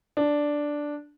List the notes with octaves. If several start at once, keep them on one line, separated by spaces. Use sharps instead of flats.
D4